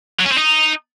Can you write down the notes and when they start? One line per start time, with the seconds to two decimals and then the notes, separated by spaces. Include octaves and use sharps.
0.19 F#3
0.25 C#4
0.32 C4
0.38 D#4